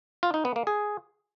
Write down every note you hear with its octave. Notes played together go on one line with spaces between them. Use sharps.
F4
D#4
B3
A#3
G#4